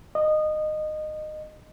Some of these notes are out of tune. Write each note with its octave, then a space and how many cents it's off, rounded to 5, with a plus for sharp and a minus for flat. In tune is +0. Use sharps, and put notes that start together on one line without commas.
D#5 -20